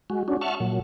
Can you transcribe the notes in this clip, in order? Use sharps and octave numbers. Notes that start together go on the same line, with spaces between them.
G#3 F#4
C#4 D4 F#4
E5 F#5 A5 C#6 F6
A#2 F#3